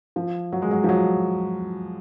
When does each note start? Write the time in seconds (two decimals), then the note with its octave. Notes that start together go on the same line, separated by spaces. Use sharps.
0.16 F3
0.52 F#3
0.62 G#3
0.71 F#3
0.84 F3
0.89 F#3